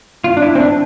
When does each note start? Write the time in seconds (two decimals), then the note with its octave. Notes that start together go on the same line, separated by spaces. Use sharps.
0.24 F4
0.37 D4
0.42 E4
0.55 C4
0.60 D4